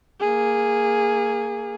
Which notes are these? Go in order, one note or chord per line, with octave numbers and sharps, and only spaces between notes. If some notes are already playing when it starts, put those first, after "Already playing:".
A#3 G#4